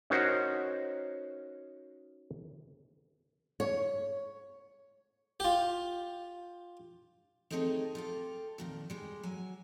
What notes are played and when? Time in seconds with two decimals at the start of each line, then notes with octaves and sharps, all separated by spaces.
0.10 C#4 D#4 F#4 A#4 C5
3.60 C#5
5.40 F4 G4
7.51 A3 C4 D#4 G#4 A4 C#5
7.95 F4 G4 A4
8.58 F2 A#2 D#3
8.90 G3 G#3
9.23 F#3 G#5